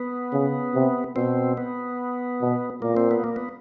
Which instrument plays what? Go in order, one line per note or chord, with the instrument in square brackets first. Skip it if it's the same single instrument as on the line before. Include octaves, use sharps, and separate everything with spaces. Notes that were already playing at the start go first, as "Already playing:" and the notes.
Already playing: [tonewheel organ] B3
[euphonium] C#3
C3
[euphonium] B2 [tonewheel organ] C4
[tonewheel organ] B3
[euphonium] B2
[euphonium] A#2 [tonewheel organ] A#3
[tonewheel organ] C4
B3
A#3
B3